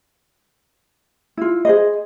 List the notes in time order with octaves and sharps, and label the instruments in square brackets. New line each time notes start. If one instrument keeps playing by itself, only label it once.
[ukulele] E4 F4
G#4 C5 D#5